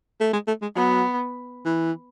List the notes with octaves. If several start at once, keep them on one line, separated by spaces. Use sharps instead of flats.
A3
G#3
A3
G#3
F#3 B3
E3